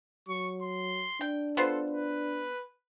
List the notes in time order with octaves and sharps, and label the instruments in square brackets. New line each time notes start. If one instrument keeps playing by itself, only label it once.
[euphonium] F#3 [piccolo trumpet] C#6
[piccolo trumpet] C6
[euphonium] D4 [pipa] G5
[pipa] B3 F4 C5 [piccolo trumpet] A4
[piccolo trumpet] B4